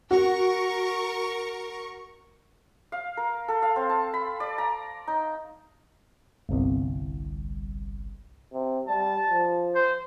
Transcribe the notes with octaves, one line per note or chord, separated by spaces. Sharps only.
F#4 A#4 C#6
F5
A#4
A4
F5
C4
A5
B5
D5
A#5
D#4
G1 C2
C3
G3 A5
F3
C5